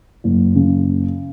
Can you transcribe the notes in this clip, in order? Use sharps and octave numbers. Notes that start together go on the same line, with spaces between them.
F#1
C#3